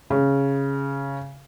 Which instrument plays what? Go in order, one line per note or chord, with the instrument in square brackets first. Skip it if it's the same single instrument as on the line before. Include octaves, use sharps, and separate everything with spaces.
[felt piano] C#3